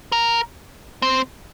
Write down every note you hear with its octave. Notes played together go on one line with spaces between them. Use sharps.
A#4
C4